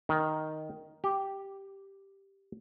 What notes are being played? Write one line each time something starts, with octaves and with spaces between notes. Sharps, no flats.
D#3
G4